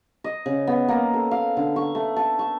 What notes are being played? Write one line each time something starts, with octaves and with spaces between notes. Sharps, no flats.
D#5
C#3
B3
A#3
A4
F5
D3
C#6
A3
A5
C#6